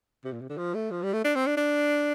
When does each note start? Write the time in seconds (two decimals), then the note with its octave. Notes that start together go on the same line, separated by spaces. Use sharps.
0.25 C3
0.33 A#2
0.41 C3
0.49 D3
0.58 F3
0.74 A3
0.91 F3
1.02 G3
1.13 A3
1.24 D4
1.35 C4
1.47 D4
1.57 D4